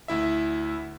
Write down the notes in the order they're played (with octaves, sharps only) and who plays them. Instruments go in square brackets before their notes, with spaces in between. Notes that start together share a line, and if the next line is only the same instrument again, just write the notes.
[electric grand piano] D2 E4 E5